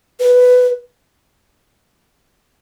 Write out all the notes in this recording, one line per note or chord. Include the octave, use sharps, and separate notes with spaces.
B4